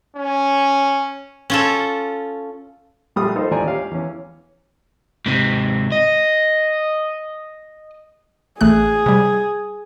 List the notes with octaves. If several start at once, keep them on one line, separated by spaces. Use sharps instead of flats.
C#4
C#4 F4 A4
A#1 G3 A3 G#4 C6 D#6
D#4 F4 A4 C5
A1 D#2 F4 D5 G#5 A#5
C#4 G4 F5 F6
E2 C#4
G#2 C3
D#5
A1 A3 G#4 F#6
C3 G3